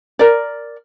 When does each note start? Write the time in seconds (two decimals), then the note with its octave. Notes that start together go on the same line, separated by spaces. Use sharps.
0.19 A#4 D5